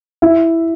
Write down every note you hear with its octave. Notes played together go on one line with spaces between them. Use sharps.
E4 E5